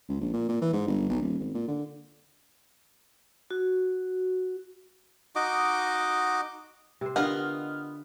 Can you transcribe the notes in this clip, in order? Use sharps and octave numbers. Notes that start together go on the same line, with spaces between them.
C#2
A#1
A#2
A#2
E3
G#2
G1
B1
D#1
G#1
A#2
D3
F#4
D#4 F#4 D#5 D6
C3 C5
D3 B3 F4 G4 A#4 D#5 F6